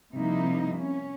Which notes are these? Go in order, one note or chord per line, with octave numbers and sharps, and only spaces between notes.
C3 F3 G3 A#3 D#4 E4
C#4